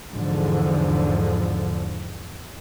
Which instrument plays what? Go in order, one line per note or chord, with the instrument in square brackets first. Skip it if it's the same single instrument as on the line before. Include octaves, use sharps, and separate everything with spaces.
[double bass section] E2 G#2 D3 F3